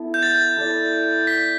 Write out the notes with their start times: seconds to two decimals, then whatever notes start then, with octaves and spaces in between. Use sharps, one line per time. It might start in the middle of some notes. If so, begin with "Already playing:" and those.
Already playing: B3 E4 A4
0.14 G6
0.23 A6
0.57 E4 A4 D5
1.27 B6